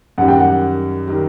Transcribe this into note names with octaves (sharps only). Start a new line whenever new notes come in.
F#2 D#3 G3 F#5
G5
F#5
D#3 G3